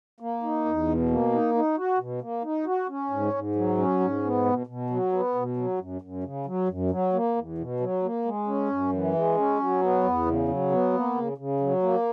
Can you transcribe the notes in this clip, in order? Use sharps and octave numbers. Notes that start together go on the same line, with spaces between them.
A#3
D#4
E2
B2
A#3
D#4
D#4
F#4
B2
A#3
D#4
F#4
C#4
G#2
G#2
F#3
C#4
G#2
B3
B2
B2
F#3
B3
B2
F#3
F#2
F#2
C#3
F#3
F#2
F#3
A#3
E2
B2
F#3
A#3
G#3
C#4
F#2
E3
G#3
C#4
F#3
B3
E2
C#3
F#3
B3
A#3
C#3
C#3
F#3
A#3